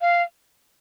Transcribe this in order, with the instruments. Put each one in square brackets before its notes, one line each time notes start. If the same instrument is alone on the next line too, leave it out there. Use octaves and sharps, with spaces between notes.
[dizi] F5